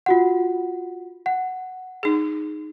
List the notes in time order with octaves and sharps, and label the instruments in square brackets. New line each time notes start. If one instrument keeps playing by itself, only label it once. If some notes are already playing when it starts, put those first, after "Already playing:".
[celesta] F4 F#4 F#5
F#5
[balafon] D#4 G#4